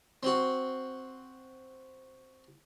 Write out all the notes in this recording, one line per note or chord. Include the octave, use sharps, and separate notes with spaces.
C4 F#4